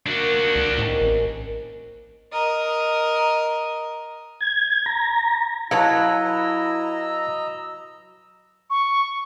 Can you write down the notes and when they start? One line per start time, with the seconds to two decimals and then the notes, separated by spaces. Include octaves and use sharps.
0.06 A#3 D4 F#4
0.56 C#2
0.78 A2 C3 D#3
1.01 A1 C#4
2.33 A#4 D#5
4.40 G#6
4.86 A#5
5.71 F#3 E4 B4 D#5 F5 A5 A#5 E6
8.70 C#6